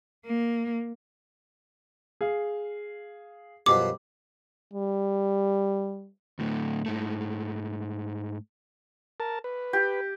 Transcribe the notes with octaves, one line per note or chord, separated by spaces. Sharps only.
A#3
G#4 F5
F#2 B2 F3 G3 D6
G3
D2 A2
G#2 A3
A#4 A5
B4
G4